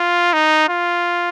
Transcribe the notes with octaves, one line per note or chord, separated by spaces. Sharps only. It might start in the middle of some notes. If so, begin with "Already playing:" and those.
Already playing: F4
D#4
F4